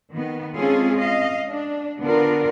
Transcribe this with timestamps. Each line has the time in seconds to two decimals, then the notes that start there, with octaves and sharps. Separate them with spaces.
0.12 D#3 B3
0.55 G#3 C4 C#4 F4 G#4 A4
0.97 D#5 F5
1.47 D4
2.01 D3 B3 D4 F4 A#4